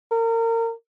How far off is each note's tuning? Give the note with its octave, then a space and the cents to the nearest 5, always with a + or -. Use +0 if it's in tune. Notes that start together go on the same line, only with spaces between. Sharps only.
A#4 -30